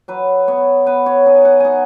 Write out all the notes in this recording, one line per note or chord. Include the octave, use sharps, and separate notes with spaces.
F#3 B4
B3 C#5
B3 B4
C#5
D#4 G#5
F#5
D#4 F#5 G#5